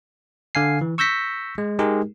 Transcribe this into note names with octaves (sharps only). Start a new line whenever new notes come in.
D3 F5 G#5 C7
E3
C#6 E6 G6 A#6 B6 C#7
G#3
G#3 D#4 G4 G#4 A#4